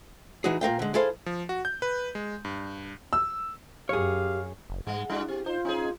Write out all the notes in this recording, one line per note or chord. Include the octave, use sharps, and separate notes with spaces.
E3 D#4 F#4 G#4
A#2 A#4 F5 G5
D3 G#3
E4 G#4 A4 C5 F5
F3
F#4
G6
B4
G#3
G2
E6
F#2 G4 G#4 C#5 F5
F#1
G#2 G3 G#3 F#5
G3 D4 E4 F#4
C4 G4
D#4 F4 C5
C#4 D#4 G#4